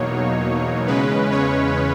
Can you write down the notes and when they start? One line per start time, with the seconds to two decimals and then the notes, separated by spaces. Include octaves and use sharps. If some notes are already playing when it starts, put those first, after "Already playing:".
Already playing: E2 B2 F#3 A#3 D#4 C#5
0.87 E2 C#3 G#3 C#4 B4
1.31 C#5